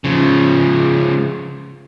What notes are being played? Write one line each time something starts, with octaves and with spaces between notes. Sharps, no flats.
C#3 F3